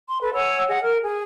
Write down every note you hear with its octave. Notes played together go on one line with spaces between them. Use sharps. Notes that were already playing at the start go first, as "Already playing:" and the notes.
C6
A4 B4
C#5 F#5 G#5 E6
G#4 D#5 F#5
A#4 F6
G#4